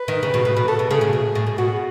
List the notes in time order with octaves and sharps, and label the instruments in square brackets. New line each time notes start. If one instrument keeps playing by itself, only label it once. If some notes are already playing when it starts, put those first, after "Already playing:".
Already playing: [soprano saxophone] B4
[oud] D#3
C#3
B2
A2
B2
[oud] C#3 [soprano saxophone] A4
[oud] B2
[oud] C#3 [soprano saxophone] G#4
[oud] A2
B2
A2
B2
[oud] B2 [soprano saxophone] F#4